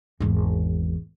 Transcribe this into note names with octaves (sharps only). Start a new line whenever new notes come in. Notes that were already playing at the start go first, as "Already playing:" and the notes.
G#1 E2